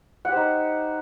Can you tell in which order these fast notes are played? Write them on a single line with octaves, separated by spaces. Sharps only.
F#5 G4 C5 D#4